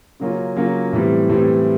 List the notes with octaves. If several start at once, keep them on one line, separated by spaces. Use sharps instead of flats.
C#3 F#3 A#3 C#4 F4
C#3 F#3 A#3 C#4 F4
A2 E3 G3 C4
A2 E3 G3 C4